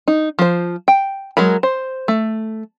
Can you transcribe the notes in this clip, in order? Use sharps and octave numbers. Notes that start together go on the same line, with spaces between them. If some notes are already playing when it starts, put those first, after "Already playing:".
D#4
F3 C5
G5
F#3 G#3 A#4 B5
C5
A3